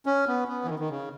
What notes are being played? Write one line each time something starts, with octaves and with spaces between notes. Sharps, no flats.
C#4
B3
B3
E3
D#3
D#3
C#3